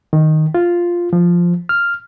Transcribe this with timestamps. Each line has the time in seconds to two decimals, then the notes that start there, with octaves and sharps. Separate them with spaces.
0.13 D#3
0.54 F4
1.13 F3
1.69 F6